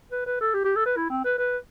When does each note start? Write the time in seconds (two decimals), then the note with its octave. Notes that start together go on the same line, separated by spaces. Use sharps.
0.12 B4
0.26 B4
0.41 A4
0.54 G4
0.64 G4
0.76 A4
0.86 B4
0.97 E4
1.10 C4
1.24 B4
1.38 B4